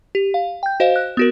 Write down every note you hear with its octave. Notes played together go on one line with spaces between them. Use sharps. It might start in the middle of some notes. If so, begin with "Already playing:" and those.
G4
F5
G5 G6
F#4 C5 D#5 F5
F#6
B3 F#4 A#4